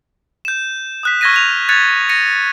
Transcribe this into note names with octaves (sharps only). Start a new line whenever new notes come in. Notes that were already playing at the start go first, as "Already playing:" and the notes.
G6 E7
D#6 F#6 B6
C#6 F6 G#6 A#6 B6 D#7
F#6 F7
F#6 G#6 A6 C#7 F7
A#6 C#7 D#7